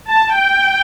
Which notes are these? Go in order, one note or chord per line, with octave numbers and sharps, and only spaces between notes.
A5
G5